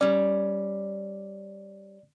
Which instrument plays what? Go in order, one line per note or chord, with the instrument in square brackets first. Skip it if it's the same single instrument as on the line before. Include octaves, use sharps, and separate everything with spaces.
[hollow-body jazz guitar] G3 C#4 [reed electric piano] D5